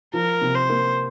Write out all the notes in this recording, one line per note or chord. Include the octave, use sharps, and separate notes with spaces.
F3 A#4
C3
C5
A#3